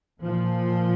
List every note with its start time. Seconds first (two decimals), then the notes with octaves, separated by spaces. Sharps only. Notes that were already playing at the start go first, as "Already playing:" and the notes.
0.22 A#2 F3